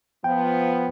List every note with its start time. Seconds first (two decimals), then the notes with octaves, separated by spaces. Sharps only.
0.24 F3 B3 G5